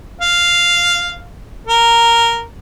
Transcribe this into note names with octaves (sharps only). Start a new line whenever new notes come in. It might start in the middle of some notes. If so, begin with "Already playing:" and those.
F5
A#4